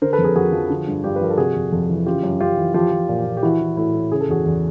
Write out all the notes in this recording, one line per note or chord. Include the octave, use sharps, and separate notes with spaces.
D3 A#4 C5
A4 B4
F2
G#4 A#4
F2 F#4 G#4
F3
D3
G2
G2 F4 G4
B4
F3 A#4
A4
C3 F#4 G#4
F2
F2
E3
C#3 F4 G4
F#2
F#2 F4 G4
E3
F3 F4 G4
F3
A#2
A#2
G4
E3 E4 F#4
E3
A2 E4 F#4
A2
C#3 G#4
A4
E2 F#4 G#4
E2